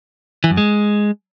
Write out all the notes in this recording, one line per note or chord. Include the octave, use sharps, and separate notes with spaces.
E3
F#2
G#3